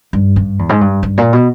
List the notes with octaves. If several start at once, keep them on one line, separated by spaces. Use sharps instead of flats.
G2
G2
E2
G#2
G2
G2
A#2
B2